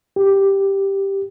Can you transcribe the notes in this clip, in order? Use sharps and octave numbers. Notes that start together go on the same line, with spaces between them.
G4